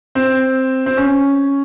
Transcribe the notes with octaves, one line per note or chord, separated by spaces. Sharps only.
C4
C4
C#4